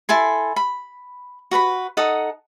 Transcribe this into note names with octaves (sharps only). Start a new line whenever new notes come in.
E4 A4 G#5 C6
B5
F#4 B4 A#5 B5
D#4 A4 F#5 D#6